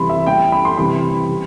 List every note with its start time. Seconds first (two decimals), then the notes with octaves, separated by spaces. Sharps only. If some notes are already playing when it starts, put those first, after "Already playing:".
Already playing: C3 E3 G3 B5 C6
0.09 E5
0.27 A2 G3 G5
0.52 B5
0.65 C6
0.77 C3 E3 G3 B5
1.29 G3